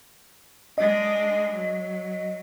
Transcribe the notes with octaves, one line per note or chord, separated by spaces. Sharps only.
G#3 D4 D#5
F#3